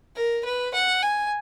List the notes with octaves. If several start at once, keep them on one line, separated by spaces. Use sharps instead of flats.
A#4
B4
F#5
G#5